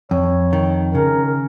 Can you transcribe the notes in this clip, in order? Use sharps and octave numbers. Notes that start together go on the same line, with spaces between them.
F2 C#5
D#3
C#3 A#4